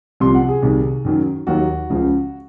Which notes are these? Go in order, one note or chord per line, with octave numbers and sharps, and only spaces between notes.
C2 C3 F3 C6
F#5
G#4
C2 C3 D#3
F#2 D#3 F#3
D#2 D#3 F#3 F#4
C#2 C#3 F3